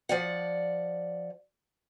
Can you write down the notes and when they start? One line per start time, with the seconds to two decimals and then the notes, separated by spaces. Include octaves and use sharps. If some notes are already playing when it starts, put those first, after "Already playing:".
0.09 F3 D5 F#5